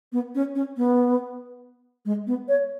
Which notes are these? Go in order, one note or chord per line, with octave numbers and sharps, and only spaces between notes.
B3
C#4
C#4
B3
G#3
B3
C#5